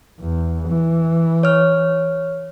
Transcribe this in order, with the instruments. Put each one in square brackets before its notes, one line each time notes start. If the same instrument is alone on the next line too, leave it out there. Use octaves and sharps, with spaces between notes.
[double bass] E2
E3
[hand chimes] C#5 F6